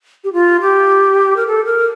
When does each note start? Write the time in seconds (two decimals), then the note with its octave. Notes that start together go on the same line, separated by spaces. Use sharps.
0.24 G4
0.33 F4
0.61 G4
1.36 A#4
1.47 A4
1.65 A#4